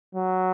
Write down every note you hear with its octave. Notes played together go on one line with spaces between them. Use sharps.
F#3